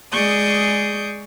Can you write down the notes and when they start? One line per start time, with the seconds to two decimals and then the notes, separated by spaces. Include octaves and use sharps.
0.12 G#3 G#4 D5 C#6 D#6 G6